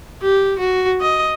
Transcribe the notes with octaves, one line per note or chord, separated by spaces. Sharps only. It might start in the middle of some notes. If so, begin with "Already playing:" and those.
G4
F#4
D#5